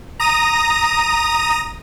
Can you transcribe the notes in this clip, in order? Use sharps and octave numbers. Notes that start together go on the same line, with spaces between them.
A#5 D#6 A#6 D#7